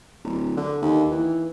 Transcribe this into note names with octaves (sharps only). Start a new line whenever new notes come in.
D1
D3
D#2
E3